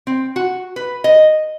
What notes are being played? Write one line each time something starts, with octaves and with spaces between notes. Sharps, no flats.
C4
F#4
B4
D#5